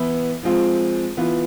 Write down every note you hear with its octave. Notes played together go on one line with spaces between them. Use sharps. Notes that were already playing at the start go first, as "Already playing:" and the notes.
Already playing: E3 B3 E4
F3 G#3 C4 F4
E3 B3 F4